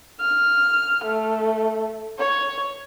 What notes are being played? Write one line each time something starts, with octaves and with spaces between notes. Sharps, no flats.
F6
A3
C#5